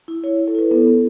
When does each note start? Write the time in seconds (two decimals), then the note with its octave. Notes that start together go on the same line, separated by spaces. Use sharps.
0.08 E4
0.24 E4 C#5
0.39 E4
0.48 A4
0.55 E4 B4
0.71 B3 A4
0.87 B3